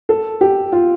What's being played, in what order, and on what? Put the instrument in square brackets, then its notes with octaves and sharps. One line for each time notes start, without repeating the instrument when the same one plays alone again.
[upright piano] A4
G4
F4